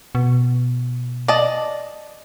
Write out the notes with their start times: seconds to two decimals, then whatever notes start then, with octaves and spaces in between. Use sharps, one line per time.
0.15 B2
1.28 D5 D#5 A5